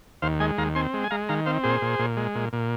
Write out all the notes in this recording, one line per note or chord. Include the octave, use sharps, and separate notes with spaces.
D#2 C5 F5
G#3 D#5 G#5
D#2 F5 A#5
C4 G#5 C6
G#3
G#5
G#3 F5 A#5
D#3 F5 A#5
C4 C5 F5
A#2 G#4 C5
A#2
A#2
G#3
A#2
A#2